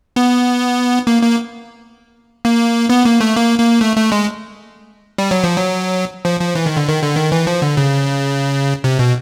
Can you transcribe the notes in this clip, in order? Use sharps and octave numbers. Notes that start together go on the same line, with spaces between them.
B3
A#3
A#3
A#3
B3
A#3
A3
A#3
A#3
A3
A3
G#3
G3
F#3
F3
F#3
F3
F3
E3
D#3
D3
D#3
D3
D#3
E3
F3
D3
C#3
C3
B2